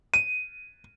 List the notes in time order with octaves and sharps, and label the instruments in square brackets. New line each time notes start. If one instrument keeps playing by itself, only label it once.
[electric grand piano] D#7